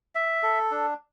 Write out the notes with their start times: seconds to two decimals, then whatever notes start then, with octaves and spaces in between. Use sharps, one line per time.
0.15 E5
0.43 A4
0.71 D4